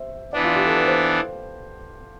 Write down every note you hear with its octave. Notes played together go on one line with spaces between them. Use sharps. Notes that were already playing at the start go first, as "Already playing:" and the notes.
Already playing: C5 E5
E3 B3 D4 D5
F4
G4
A4
B4
C5